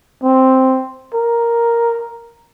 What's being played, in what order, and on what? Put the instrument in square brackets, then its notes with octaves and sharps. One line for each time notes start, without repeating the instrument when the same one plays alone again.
[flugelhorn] C4
A#4